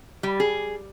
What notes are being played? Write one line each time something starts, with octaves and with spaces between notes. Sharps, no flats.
G3
G#4